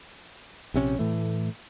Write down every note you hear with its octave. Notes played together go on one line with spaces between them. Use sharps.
A#1 C3 C#4
A2 E3 A3